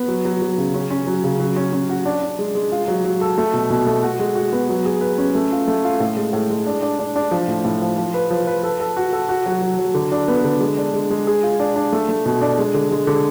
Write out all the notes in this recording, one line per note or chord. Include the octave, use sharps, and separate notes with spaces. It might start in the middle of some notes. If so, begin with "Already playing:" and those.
Already playing: B3
F#3
F#3
F#3
C#3
C#4
C#4
F#3
C#3
F#3
C#4
C#4
F#4
D4
D4
G#3
G#3
F4
F#3
F#3
A4
A3
B2
B2
A3
F#4
G#3
F#4
B3
F#3
G#4
B4
C#4
A3
F4
A3
F4
A2
G#3
A2
G#3
D4
D4
D4
D4
F3
A2
A2
F3
F3
B4
F3
B4
A4
A4
F#4
A4
F#4
F#3
F#3
F#3
D3
D4
B3
D3
G#3
D4
G#3
G#3
G#4
F4
D4
D4
A3
A3
B2
D4
G#3
D3
G#3
D3